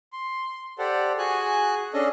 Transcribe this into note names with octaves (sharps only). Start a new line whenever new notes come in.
C6
G4 A4 C5 D5 F#5
F#4 G#4 G#5 F#6
C#4 D4 G#4 A4 D#5